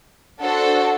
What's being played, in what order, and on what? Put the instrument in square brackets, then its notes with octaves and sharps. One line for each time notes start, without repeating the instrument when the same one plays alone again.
[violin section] D4 F#4 A4 C5